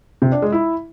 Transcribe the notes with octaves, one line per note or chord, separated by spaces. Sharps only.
C3
D4
G#3
E4